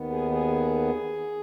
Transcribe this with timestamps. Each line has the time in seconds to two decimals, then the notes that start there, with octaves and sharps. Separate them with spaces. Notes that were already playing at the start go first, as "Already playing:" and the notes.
Already playing: D#2 D#3 B3
0.10 G#4
0.31 G#4